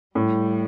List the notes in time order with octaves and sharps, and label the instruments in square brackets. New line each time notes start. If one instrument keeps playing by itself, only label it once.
[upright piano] A2 [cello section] G3